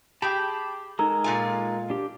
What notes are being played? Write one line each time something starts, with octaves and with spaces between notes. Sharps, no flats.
G4 G#4 G5 A5 B5
G#3 D#4 A4 A#4 A#5
A#2 F4 G#5
D4 G4